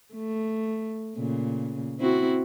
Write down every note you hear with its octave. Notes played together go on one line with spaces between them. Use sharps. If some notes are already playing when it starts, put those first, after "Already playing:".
A3
A#2 C#3
C4 E4 F#4